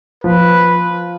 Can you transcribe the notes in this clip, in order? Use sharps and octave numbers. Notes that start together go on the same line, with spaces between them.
F3 B4